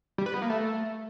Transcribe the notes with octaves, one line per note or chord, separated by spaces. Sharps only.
G3
B4
B3
A#3
A3